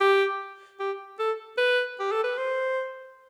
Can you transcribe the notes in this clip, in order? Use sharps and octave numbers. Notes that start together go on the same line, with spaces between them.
G4
G4
A4
B4
G4
A4
B4
C5